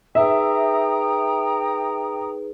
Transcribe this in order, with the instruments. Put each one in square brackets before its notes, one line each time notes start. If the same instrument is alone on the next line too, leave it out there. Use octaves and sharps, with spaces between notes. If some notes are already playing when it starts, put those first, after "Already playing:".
[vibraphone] D#4 G#4 B4 [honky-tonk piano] E5 [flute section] G5 A#5 D#6